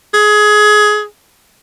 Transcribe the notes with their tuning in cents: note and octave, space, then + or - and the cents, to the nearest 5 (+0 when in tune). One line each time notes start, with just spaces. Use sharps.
G#4 +20